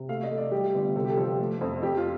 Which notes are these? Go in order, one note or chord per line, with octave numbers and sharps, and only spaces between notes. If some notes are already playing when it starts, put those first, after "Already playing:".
Already playing: C3
A3 F5
D#5
A3
D5
G3 G4
G1
C3 A4
G4
A4
F3
G4
A3
F2
F2 G4
F4